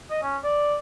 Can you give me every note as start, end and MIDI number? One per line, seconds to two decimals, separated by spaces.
0.10 0.22 75
0.22 0.37 61
0.44 0.76 74